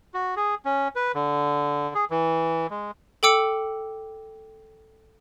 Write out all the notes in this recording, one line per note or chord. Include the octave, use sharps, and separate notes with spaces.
F#4
G#4
C#4
B4
D3
G#4
E3
G#3
A4 G5 D6 E6 C#7